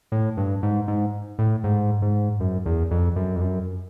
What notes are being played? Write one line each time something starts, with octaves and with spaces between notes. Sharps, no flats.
A2
G2
G#2
G#2
A2
G#2
G#2
F#2
E2
F2
F#2
F2
F#2